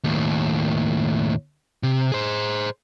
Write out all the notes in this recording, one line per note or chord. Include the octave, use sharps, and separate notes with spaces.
D#2 A2
C3
G#4 C5